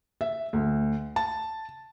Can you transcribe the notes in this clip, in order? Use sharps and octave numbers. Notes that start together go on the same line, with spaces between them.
E5
D2
A5